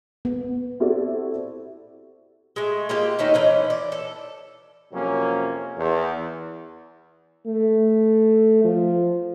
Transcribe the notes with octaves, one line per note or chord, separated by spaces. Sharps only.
B3
C4 E4 F#4 G4 A4 D5
G#3 A3
G#3 A#3 F4 G4
D#3 A3 C#4 D#4
E3 C#4 C5
D5
A4
F2 C3 F#3 A#3 C#4
E2
A3
F3